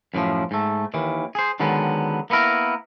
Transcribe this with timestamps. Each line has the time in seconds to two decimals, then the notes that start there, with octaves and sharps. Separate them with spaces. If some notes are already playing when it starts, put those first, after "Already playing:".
0.14 F#2 A2 E3 F3
0.51 G#2 A3
0.94 D#2 D#3 E3
1.35 G#4 C5
1.60 D3 D#3 F#3 G#3 B3
2.30 A#3 B3 E4 A#4